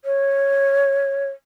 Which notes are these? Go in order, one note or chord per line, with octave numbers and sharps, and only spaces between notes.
C#5